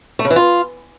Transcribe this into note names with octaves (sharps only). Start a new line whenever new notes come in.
A3
C#3
E3
F4